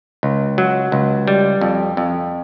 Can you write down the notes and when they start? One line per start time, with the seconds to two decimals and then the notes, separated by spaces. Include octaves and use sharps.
0.23 C#2
0.58 F#3
0.92 C#2
1.28 G3
1.61 F2
1.97 F2